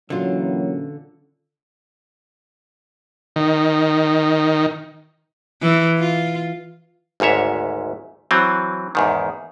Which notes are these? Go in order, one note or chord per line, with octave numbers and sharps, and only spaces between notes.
A#2 D3 E3 F#3 C#4 F4
D#3
E3
F4
G#1 D2 G#2 C#5 E5
E3 F#3 C4
E2 G#2 D#3